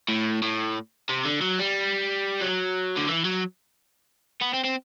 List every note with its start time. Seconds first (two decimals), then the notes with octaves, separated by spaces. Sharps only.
0.08 A2
0.43 A2
1.09 C3
1.25 D3
1.41 F#3
1.59 G3
2.41 F#3
2.97 D3
3.09 E3
3.25 F#3
4.42 B3
4.54 C4
4.64 C4